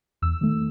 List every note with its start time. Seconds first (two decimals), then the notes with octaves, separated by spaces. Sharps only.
0.22 E2 E6
0.41 D#3 A3